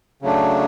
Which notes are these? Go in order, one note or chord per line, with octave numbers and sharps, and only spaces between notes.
C#3 F#3 A3 D4